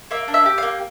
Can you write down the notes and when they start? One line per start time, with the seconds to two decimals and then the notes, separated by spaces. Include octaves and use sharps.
0.11 A#3 E5
0.28 D4
0.34 E5
0.46 G4
0.58 F5
0.63 A#3